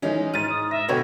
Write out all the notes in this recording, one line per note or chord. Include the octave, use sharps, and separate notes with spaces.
D#3 E3 G#3 C#4 D#4
G#2 F6 A6 D#7
D#6
E5 A#6
B2 D3 B4 C#5 G5 G#6